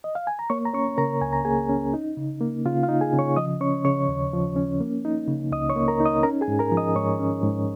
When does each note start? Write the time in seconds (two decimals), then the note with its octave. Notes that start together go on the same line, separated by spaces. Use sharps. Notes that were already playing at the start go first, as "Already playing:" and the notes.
0.04 D#5
0.15 F5
0.27 G#5
0.39 A#5
0.50 A#3 C#5 C#6
0.65 A#5
0.73 C#4 C#5 C#6
0.98 C#3 A#4 A#5
1.22 C#2 G#5
1.33 A#5
1.45 A#3 G#4 G#5
1.69 C#4
1.94 D#4
2.17 C#3
2.41 A#3
2.66 C#3 F4 F5
2.83 F4 F5
2.89 D#4
3.01 G#4 G#5
3.13 C#3
3.19 C#5 C#6
3.36 F3 D#5 D#6
3.61 C#4 C#5 C#6
3.85 C#3 C#5 C#6
4.08 D#2
4.33 F3
4.56 C#4
4.81 A#3
5.05 D#4
5.28 C#3
5.51 C#2 D#5 D#6
5.69 C#5 C#6
5.76 A#3
5.88 A#4 A#5
6.00 D#4
6.06 D#5 D#6
6.23 C#4 A#4 A#5
6.41 G#4 G#5
6.48 G#2
6.59 A#4 A#5
6.72 F3
6.77 D#5 D#6
6.95 G#2 C#5 C#6
7.20 C#4
7.43 G#2